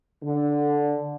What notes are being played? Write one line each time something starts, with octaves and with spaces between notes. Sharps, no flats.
D3